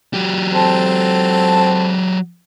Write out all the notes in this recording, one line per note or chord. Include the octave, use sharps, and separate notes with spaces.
F#3 G4
C4 A4 A5